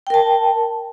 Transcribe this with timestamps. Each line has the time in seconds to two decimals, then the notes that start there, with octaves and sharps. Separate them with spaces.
0.07 G5
0.10 A#4
0.14 A5